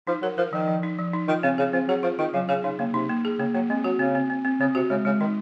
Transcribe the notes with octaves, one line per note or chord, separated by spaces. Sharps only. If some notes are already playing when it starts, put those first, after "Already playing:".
F3 D#4
F#3 A#4
F3 A#4
D#3 F3
F3
D#4
F3
D#4
D#3 F4
C#3 C4
C#3 G#4
F3 C4
F#3 G#4
F3 F4
D#3 F4
C#3 F#3
C#3 G#4
C#3 D#4
C#3 A#3
C3 D#4
A#3
G#4
C#3 A#3
F#3 A#3
G#3 C4
F#3 F#4
C#3 C4
C4
C4
C4
C#3 C4
C3 F#4
C#3 G#3
C#3 G#3
D#3 D#4